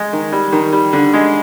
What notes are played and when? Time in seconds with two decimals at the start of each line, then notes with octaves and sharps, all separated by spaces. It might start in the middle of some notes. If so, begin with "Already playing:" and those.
Already playing: G#3
0.13 D#3
0.32 G3
0.53 D#3
0.73 G3
0.93 D3
1.13 G#3